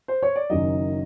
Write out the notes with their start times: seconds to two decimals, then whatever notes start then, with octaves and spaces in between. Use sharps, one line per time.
0.08 C5
0.23 C#5
0.36 D5
0.50 F#1 F#2 D#3 F#3 D#5